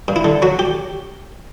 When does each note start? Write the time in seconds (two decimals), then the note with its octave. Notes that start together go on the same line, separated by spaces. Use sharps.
0.08 G2
0.16 E4
0.24 D3
0.42 F#3 F#4
0.59 G4